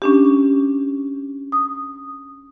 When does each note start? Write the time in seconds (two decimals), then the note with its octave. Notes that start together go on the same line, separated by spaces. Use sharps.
0.02 C#4 D4 G4
1.52 D#6